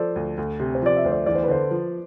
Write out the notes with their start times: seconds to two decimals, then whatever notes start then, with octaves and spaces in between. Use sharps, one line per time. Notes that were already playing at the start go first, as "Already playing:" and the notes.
Already playing: F3 A4 C5 D5
0.16 D2
0.38 D2
0.60 C3
0.75 C5
0.82 F3 D5
0.97 E5
1.04 D2 C5
1.12 D5
1.26 E2 D5
1.35 C5
1.43 B4
1.48 D3 C5
1.71 F3